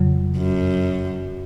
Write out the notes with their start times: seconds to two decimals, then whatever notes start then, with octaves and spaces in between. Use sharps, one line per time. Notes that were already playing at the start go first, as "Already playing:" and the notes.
Already playing: F2 C#3 F#3
0.37 F#2